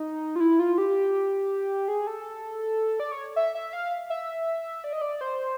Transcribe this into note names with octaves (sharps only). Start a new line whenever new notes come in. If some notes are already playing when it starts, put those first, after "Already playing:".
Already playing: D#4
F4
E4
F4
G4
G#4
A4
D5
C#5
E5
E5
F5
E5
D5
D#5
D5
C5